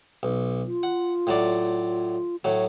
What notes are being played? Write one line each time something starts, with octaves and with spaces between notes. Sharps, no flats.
B1
F4
F#5
A2 F#3 D5
A2 F#3 C#5